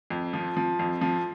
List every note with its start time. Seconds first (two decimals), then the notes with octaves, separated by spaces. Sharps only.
0.10 F2
0.33 F3
0.57 F3
0.79 F2
1.01 F3